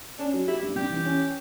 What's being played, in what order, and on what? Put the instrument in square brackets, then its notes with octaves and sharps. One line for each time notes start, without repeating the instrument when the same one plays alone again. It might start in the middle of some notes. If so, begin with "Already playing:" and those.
[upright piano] C#4 [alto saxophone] D4
[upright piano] F#3
[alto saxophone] E4 [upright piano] G4
[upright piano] G2
[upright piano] G3 [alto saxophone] G4
[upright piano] E3
C#4